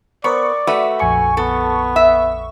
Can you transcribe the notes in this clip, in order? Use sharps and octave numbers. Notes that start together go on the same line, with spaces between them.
B3 A#4 C5 D5 C#6
A3 F#4 B4 E5
A#1 F2 G#5 C#6
B3 A4
E5